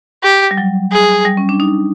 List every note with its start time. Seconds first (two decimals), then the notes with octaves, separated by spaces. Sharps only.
0.23 G4
0.51 G3
0.58 F#3
0.92 G#4
1.25 G3
1.37 C#4
1.49 D4
1.60 D#4